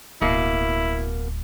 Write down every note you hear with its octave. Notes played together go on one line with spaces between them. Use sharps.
D1 B2 A#3 E4